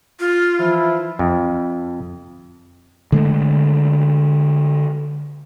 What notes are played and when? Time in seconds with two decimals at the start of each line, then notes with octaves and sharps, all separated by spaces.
0.20 F4
0.59 E3 F3 E4
1.19 F2
3.12 D3 G#3 A3